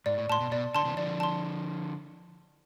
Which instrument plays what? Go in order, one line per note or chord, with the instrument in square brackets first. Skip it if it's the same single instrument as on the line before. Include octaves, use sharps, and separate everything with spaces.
[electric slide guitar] G#2 [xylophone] D5
[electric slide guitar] A2
[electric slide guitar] A2 [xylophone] A5 C6
[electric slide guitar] B2
[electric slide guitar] B2 [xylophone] D5
[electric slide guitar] D3 [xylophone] A5 C6
[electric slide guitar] C3 E3
[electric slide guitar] D3 F3 [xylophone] D5
[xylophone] A5 C6